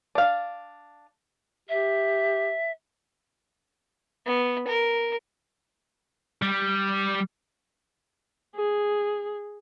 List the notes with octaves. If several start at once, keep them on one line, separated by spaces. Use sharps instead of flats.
D4 F5
G4 E5
B3
A#4
G3
G#4